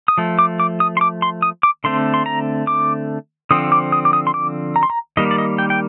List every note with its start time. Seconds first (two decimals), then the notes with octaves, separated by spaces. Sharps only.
0.08 D#6
0.18 F3 A3
0.39 D6
0.60 D6
0.80 D#6
0.97 C6
1.01 D6
1.22 C6
1.42 D#6
1.63 D6
1.84 D3 A3 C4 C6
2.14 C6
2.26 A#5
2.67 D6
3.51 D3 F3 C4 D#6
3.72 D6
3.92 D#6
4.05 D6
4.13 D#6
4.27 C6
4.34 D6
4.76 A#5
4.83 C6
4.90 A#5
5.17 D#3 G3 A#3 D#5
5.31 D5
5.38 D#5
5.58 G5
5.70 G5